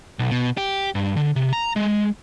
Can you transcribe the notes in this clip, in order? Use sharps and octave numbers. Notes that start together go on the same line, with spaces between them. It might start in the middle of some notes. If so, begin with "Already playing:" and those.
B1
B2
G4
G2
D3
C3
A#5
G#3